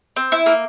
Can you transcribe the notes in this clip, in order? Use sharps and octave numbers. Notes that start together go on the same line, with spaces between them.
C4
E4
A#3